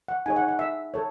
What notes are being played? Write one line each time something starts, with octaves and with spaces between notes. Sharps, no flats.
F#5
D#4 G#4 C#5 G#5
F#5
F#5
E5
A4 C#5